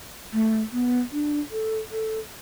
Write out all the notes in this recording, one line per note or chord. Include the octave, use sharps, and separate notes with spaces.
A3
B3
D4
A4
A4